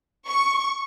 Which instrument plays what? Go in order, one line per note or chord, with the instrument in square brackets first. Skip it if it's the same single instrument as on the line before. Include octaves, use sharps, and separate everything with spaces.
[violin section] C#6